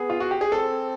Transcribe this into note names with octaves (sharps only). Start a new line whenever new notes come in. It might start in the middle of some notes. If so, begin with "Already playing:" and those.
Already playing: B3 G#4
F4
F#4
G4
G#4
C4 A4